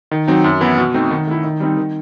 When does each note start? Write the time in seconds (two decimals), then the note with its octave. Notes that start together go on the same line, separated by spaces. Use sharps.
0.11 D#3
0.27 F#3 C4 D#4
0.44 F#2
0.61 E3 B3 E4
0.78 B2
0.94 A3 C4 D#4
1.11 D#3
1.27 A3 E4
1.44 D#3
1.60 G3 C4 D#4
1.77 D#3